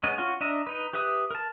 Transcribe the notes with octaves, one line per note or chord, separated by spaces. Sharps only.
G#3 B3 C#4 D#5
C#4 F4 F#4
D4 D#5 E5 A#5
D#4 B4
G4 B4 E5 D#6
A#4 A5